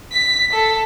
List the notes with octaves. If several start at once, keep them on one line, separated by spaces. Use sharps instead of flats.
B6
A4